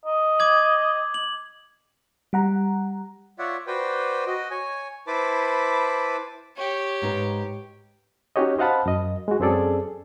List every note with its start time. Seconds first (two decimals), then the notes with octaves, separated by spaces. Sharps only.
0.05 D#5
0.39 D6 G#6 F#7
1.14 F#7
2.33 G3 F#5 A#5
3.39 F4 C#5 D5 E5 F#5
3.67 F#4 B4 C5 D5 G5
4.27 F#4 D#5
4.51 C#5 G#5
5.07 E4 B4 C5 A5 B5 D6
6.57 G4 C#5
7.02 G#2 D#4 B4
8.36 C#4 D#4 F#4 G4 C#5 D#5
8.59 C5 D#5 F5 F#5 A5 B5
8.86 F#2 D#5
9.28 G#3 F#4
9.40 F#2 C4 C#4 G#4 A4 D5